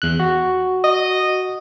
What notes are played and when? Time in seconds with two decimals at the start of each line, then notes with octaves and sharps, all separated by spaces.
0.02 E2 F#6
0.20 F#4
0.84 D#5